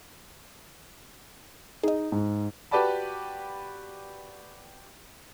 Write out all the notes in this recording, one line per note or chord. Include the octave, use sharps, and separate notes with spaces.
D#4 G#4 D#5
G#2
F#4 G4 B4 D5 A5 B5